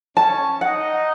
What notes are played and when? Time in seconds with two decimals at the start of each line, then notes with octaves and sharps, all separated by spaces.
0.16 C#4 C#5 A5
0.61 D#4 D#5 F#5